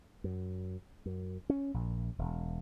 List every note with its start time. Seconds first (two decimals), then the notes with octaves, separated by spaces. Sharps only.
0.24 F#2
1.06 F#2
1.50 C#4
1.74 A#1
2.18 E1